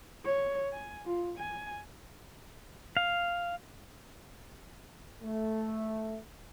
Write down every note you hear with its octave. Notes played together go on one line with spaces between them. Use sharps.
C#5
G#5
F4
G#5
F5
A3